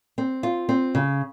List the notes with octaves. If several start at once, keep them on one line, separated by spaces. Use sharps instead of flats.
C4
F4
C4
C#3